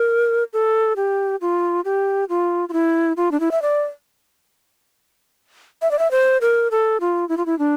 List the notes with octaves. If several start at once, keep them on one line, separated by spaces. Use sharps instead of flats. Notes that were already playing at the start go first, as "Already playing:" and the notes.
Already playing: A#4
A4
G4
F4
G4
F4
F4
E4
F4
D4
E4
E5
D5
E5
D5
E5
C5
A#4
A4
F4
E4
F4
E4
D4